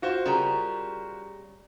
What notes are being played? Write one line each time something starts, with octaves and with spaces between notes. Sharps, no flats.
F4 F#4 C5
C#3 G3 A#4